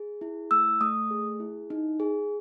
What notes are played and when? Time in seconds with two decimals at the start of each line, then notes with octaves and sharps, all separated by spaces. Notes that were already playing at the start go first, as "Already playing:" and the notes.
Already playing: G#4
0.21 E4
0.51 A3 E6
0.81 A3 D#6
1.11 G#4
1.40 E4
1.70 D#4
2.00 G#4